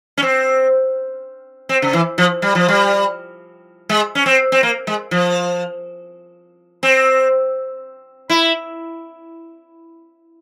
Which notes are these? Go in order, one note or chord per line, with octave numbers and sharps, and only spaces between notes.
C#4
C4
C4
C#3
E3
F3
G3
F3
G3
G#3
C#4
C4
C4
A#3
G#3
F3
C4
E4